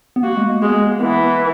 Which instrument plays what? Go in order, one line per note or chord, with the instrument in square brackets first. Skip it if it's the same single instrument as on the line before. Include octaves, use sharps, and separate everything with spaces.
[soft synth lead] B3
[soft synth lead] A#3 [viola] F#4
[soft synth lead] G#3
A#3
[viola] G#3 [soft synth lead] B3
[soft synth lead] A#3
[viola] E3 [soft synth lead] B3